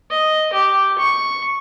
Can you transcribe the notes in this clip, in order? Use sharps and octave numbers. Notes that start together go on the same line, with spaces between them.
D#5
G4
C#6